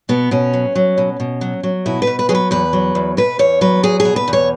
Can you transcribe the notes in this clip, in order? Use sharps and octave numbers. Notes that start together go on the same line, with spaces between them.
B2 B3
B2 C#4
F#3
F#3
B2
B2
F#3
F#3
B2 E4
B4
B2
B4
F#3 G#4
B4
E2 B4
F#3
E2
B2 B4
E2 C#5
F#3 B4
E2 G#4
G#4
B2
B4
E2
C#5